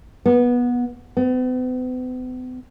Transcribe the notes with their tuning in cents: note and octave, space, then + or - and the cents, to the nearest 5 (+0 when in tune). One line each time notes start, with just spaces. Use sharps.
B3 -20
B3 +45